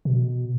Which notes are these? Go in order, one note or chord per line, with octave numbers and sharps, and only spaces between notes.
B2